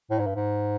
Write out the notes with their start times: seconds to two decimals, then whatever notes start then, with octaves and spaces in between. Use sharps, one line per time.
0.11 A2
0.19 G#2
0.26 G2
0.35 G#2